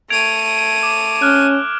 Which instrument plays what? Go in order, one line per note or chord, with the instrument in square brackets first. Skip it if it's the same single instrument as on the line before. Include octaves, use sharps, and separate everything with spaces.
[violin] A3 D#7 [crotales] G#6 D7 F7
[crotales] D6 E7
[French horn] C#4 [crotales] F6 F#6